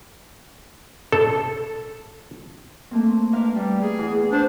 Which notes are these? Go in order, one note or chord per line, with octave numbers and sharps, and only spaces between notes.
A4
A3 A#3 C4
A#3 D4 B4 F5
G3
G#4
E2
D4 C5